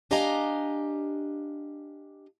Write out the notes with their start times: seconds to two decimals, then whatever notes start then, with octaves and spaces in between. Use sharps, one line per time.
0.11 D4 G4 D#5 F5 G#5 A#5